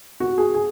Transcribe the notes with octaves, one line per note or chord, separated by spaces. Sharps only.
F#4
G#4
G#4